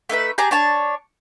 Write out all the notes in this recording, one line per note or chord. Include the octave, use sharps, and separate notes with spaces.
A3 D#4 B4 E5
G4 G#4 A5 A#5
D4 C#5 A5